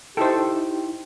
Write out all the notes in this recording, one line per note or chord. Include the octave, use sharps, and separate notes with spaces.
D#4 E4 G4 A4 C5 G5